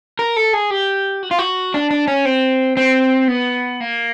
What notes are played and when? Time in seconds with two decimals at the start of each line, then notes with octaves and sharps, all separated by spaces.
0.19 A#4
0.36 A4
0.53 G#4
0.71 G4
1.23 F#4
1.31 F4
1.39 F#4
1.74 D4
1.91 D4
2.08 C#4
2.25 C4
2.77 C4
3.28 B3
3.80 A#3